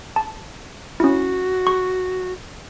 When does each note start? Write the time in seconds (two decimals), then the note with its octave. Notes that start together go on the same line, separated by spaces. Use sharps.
0.16 A5
1.00 C#4 E4 F#4
1.67 C#6